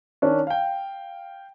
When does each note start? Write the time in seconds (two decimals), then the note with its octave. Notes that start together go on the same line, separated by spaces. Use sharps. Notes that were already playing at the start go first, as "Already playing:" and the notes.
0.22 D#3 C#4 D4
0.47 F5 G5